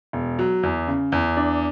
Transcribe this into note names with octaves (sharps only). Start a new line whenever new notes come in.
E1
F#3
E2
C#3
E2
D4